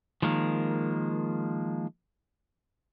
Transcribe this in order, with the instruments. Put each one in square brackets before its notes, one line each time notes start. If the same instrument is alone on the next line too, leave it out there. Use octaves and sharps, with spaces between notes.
[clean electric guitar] D#3 [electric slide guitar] F3 G#3 A#3